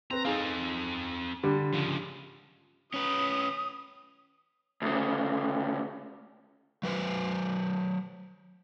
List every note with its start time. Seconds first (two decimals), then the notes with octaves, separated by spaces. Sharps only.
0.11 C4 B4 A#5
0.25 C4 D#4 G#4 A4 F5
1.43 D3 G3
1.73 C#3 F3
2.94 C#4 B4 D#6
4.82 D2 C#3
6.83 F#3 B4 C5